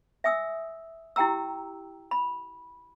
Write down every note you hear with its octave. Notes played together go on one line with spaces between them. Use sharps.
E5 G#5 D#6 E6
E4 G4 G5 A#5 E6
B5